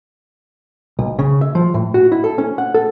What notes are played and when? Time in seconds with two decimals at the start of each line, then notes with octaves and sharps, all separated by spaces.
0.99 B1
1.19 C#3
1.41 E5
1.55 F3
1.74 A2
1.94 F#4
2.12 E4
2.24 A4
2.38 C#4
2.58 F#5
2.74 A4